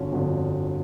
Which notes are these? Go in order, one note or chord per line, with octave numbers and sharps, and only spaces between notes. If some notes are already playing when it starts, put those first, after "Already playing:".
Already playing: G1 F2 D3 F#3 C#4
G1 F2 D3 F#3